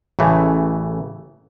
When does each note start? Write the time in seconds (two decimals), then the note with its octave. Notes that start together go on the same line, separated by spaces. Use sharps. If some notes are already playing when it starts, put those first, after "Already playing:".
0.19 A1 C#3 E3 A3